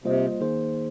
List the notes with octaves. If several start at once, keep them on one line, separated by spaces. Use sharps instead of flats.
C3 G3 A#3 F4 C5 D#5
D#3 A#3 D#4 G#4 C5